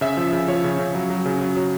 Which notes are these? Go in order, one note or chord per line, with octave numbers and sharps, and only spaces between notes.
C#3 E5
F3
C#3
F3 C#5
C#3
C#3
F#3
F#3
C#3
F#3
F#3